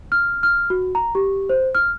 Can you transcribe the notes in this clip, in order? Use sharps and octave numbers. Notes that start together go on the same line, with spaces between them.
F6
F6
F#4
A#5
G4
C5
F6